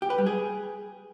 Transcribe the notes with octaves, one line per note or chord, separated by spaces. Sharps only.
G4
B4
G3
G#4